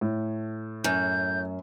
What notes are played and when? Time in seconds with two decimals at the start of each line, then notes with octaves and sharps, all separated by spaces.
0.01 A2
0.84 F#2 G6